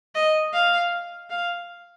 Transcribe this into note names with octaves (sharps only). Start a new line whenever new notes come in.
D#5
F5
F5